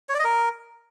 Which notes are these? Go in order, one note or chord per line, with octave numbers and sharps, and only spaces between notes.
C#5
D5
D#5
A#4